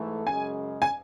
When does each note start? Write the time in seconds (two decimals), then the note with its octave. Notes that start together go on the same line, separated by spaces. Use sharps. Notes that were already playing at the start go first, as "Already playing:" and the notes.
Already playing: G#2 E3 A3
0.26 F#2 C#3 G#3 G#5
0.82 G#5